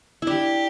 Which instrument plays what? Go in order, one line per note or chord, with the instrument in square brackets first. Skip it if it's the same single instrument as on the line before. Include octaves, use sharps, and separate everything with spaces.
[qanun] D4 E4 [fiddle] G4